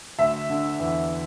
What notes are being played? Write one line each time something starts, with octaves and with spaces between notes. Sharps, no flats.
D2 E5
D3
E2